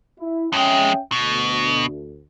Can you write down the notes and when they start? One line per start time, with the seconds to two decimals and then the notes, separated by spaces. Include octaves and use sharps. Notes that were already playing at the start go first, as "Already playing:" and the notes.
0.19 E4
0.52 F2 G#3 C#4 E5 G5
1.12 D2 B2